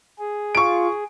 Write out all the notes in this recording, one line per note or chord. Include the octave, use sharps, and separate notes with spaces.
G#4
F4 C#6 D7